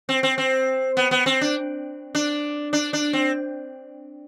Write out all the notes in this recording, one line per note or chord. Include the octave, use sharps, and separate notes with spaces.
C4
C4
C4
B3
B3
C4
D4
D4
D4
D4
C4